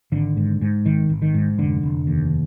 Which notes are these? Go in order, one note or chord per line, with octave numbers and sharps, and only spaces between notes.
G#1 D3
G#2
G#2
G#1 D#3
G#1
D#3
G#2
F1 D3
F1
D#2